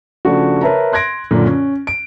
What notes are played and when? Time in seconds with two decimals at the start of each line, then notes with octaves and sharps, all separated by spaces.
0.25 C#3 F3 A3 D4 F#4
0.62 A#4 B4 C#5 E5 A5 A#5
0.93 C6 F#6 G#6 A#6 D7
1.31 F#2 A#2 D3
1.47 C#4
1.87 D7